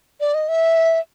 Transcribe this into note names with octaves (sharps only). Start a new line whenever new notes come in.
D5
D#5
E5